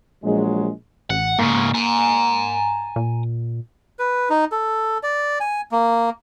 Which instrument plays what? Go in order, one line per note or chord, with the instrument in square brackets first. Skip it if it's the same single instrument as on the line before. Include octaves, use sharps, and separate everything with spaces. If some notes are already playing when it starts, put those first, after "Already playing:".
[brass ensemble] A#1 F#3 G#3
[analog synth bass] A1 [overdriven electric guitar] F#5
[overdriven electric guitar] G#2 C#3 [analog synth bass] A#3
[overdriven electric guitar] G#5 A#5
[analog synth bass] A#2
[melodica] B4
D#4
A4
D5
G#5
A#3